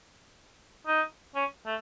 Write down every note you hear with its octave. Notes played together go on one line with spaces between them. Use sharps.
D#4
C#4
A3